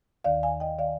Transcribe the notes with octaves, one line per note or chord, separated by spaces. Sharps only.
D#2 D#3 D5 F5
F5 G#5
D#5 G5
D#3 D5 F5